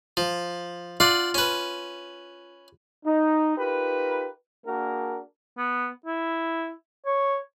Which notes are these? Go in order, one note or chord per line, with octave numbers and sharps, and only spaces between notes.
F3
F4 D5 F#5
C#4 B4
D#4
D#4 F4 G4 A#4 B4
A#3 D4 F#4 G#4 A#4
B3
E4
C#5